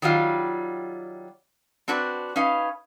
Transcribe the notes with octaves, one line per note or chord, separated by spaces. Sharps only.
D#3 F#3 G3 F4
C4 D4 F#4 B4 D5
C#4 D#4 B4 F5